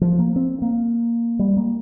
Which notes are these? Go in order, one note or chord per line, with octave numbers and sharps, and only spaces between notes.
F3
A#3
C4
A#3
G3
A#3